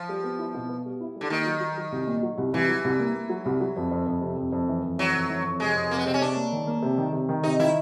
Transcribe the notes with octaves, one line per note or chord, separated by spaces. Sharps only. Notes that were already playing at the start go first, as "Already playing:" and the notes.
Already playing: F3
G3
B3
E4
B2
B3
G3
E4
G3
D3
D#3 A#3
F#3
F#3
F#3
C2
A#2
F#3
C2
C2 E3
F#3
C2
A#3
A#3
F#3
C2
F#3
F2
F2
F2
C3
F2
F2
E3
F2
E3 F#3
F2
E3
F2
C3 G#3
F2
C3 A#3
B3
C3 C4
C#4
C3 D4
A#3
D#3
A#3
C3
D#3
C3
D#3
C3 D#4
D#3 E4